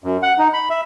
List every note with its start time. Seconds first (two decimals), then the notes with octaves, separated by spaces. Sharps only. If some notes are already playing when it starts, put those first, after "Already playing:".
0.04 F#2
0.23 F#5
0.38 D#4
0.53 B5
0.70 E5